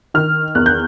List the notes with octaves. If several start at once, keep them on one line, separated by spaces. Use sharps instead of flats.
D#3 F6
E2 F#6
G6